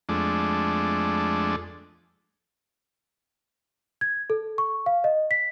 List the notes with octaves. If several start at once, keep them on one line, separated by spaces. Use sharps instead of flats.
F2 G#3 A3 D4
G#6
A4
C#6
F5
D#5
B6